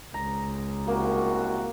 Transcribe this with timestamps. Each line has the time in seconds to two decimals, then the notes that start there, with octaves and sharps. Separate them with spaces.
0.14 C#2 A#5
0.88 C2 A#3 F#4